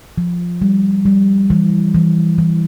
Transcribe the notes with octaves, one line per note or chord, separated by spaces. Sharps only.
F3
G3
G3
E3
E3
E3